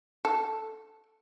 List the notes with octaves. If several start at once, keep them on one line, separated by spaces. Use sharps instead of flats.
A4